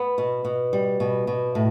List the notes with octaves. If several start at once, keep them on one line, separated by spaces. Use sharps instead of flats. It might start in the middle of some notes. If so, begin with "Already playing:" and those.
Already playing: B3
B2
B2
G3
B2
B2
A2